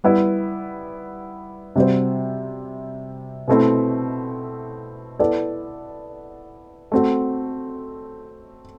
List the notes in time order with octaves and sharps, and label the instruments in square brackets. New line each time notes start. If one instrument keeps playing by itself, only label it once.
[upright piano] G3 B3 E4
C3 G3 C4 F#4 C5
B2 A3 C4 E4
B3 E4 A4 D5
A3 C4 F#4